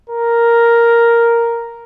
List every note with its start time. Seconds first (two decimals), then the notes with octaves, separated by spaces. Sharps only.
0.10 A#4